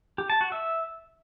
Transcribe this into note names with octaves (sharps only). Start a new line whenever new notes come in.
G4
A5
F#4
E5